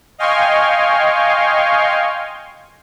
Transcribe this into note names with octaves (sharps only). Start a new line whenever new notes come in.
D#5 F5 G5 G#5 C6 C#6